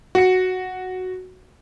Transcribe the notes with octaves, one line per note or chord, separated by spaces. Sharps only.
F#4 C#7